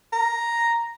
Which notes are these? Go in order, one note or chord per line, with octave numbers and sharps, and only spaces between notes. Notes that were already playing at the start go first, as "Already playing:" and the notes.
A#5